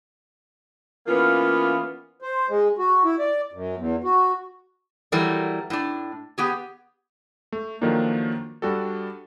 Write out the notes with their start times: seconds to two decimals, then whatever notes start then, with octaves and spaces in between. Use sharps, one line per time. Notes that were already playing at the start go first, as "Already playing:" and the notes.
1.07 E3 A#3 B3 C#4 F4
2.22 C5
2.49 G#3
2.78 F#4
3.04 E4
3.19 D5
3.52 F#2
3.77 E2
4.04 F#4
5.12 E3 F#3 G3 A3 A#4
5.70 A2 D4
6.38 B3 G4 G#4
7.52 A3
7.81 D#3 F3 F#3 A3 A#3 D4
8.62 G3 D4 F#4 G4 A4